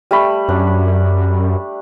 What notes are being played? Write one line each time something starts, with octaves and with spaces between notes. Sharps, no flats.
G3 A3 B5
F#2 D4